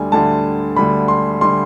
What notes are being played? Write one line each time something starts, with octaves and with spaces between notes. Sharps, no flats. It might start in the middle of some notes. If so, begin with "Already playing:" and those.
Already playing: D2 D3 G3 G#5
D2 D3 G3 A5
D2 D3 G3 B5
C6
D3 G3 C6